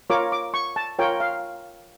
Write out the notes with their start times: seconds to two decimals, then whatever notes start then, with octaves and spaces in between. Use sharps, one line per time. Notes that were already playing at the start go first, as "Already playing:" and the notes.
0.10 F4 A#4 C#5 D6
0.32 D6
0.54 C#6
0.76 A5
0.99 F4 A#4 C#5 G5
1.20 F5